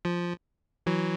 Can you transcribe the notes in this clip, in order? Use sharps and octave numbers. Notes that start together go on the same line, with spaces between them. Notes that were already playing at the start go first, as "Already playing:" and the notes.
F3
E3 F#3